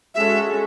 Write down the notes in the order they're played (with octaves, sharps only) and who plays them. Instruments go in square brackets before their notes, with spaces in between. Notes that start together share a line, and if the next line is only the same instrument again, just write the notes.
[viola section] G#3 C#4 F#4 A4 [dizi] E5